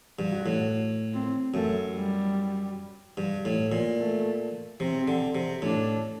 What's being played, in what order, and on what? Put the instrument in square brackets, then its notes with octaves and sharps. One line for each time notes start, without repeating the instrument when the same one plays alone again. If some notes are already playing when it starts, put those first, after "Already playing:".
[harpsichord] G2
[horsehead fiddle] F#4
[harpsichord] A2
[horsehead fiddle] C4
[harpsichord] F#2 [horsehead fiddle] A3
[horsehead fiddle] G3
[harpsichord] G2
A2
A#2
[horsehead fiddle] A3
[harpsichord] C3 [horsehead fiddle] C4
[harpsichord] D3
C3
[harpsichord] A2 [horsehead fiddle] D4